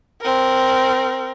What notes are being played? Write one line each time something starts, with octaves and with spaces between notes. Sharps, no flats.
C4 A#4